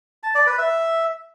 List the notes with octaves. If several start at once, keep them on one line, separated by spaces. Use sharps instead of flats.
A5
D5
B4
E5